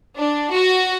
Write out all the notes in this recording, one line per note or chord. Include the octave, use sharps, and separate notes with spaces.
D4
F#4